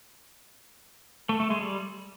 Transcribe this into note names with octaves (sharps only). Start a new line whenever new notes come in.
A3
A3
G#3
G3